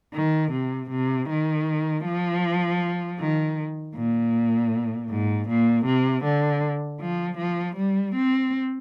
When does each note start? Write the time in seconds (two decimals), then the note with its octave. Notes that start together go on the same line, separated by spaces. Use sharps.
0.14 D#3
0.52 C3
0.91 C3
1.29 D#3
2.05 F3
3.20 D#3
3.95 A#2
5.10 G#2
5.49 A#2
5.86 C3
6.25 D3
7.01 F3
7.39 F3
7.77 G3
8.16 C4